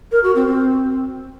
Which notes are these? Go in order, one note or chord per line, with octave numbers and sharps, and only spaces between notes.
A#4
F#4
C4
C4